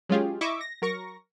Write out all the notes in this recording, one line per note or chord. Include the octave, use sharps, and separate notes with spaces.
F#3 G#3 C#4 F4 G4 G#4
E4 D#5 E5 C#6 D6
A#6
F#3 A#4 C#6 A#6